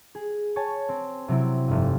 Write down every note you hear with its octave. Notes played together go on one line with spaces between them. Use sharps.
G#4
C#5 G#5 A5
C4
C3 F#3 C4 E4
F1 G2